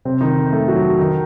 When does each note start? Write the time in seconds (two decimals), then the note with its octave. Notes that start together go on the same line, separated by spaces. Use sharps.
0.05 C3 C4
0.21 D#3 D#4
0.52 A3 A4
0.68 F#3 F#4
0.99 D#3 D#4